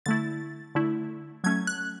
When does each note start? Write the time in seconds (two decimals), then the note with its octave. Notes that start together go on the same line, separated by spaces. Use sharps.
0.06 D3 A3 E4 A6
0.75 D3 A3 E4
1.44 F#3 A3 C#4 G#6
1.67 F#6